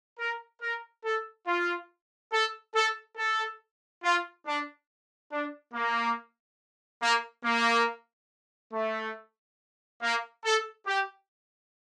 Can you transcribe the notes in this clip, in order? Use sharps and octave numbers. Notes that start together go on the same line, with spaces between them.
A#4
A#4
A4
F4
A4
A4
A4
F4
D4
D4
A#3
A#3
A#3
A3
A#3
A4
G4